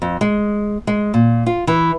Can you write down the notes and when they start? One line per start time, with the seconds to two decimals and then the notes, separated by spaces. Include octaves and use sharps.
0.02 F2
0.21 G#3
0.87 G#3
1.14 A#2
1.46 F4
1.67 E3